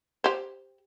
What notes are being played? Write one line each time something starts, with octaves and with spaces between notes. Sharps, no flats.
G4 C5